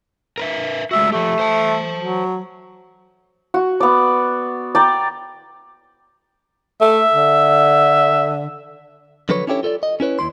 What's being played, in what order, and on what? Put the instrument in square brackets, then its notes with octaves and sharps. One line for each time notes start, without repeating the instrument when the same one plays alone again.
[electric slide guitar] A#4 B4 E5
[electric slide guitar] G#3 A3 F#4 [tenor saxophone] E5
[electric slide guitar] F3 G4 [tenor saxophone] A3
[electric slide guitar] C5 A5
[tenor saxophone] F#3
[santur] F#4
B3 D5
D5 G5 A#5
[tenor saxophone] A3 [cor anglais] E5
[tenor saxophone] D3
[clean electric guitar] D3 F3 F#3 A4 B4 C#5
C#4 D4 E4 G4 A4 C#5
F4 A4 C#5 D5
D#5
C#4 E4 B4 C#5
D#2 A#3 E4 C6